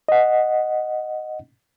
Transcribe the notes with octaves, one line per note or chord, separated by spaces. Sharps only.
D#5 F#5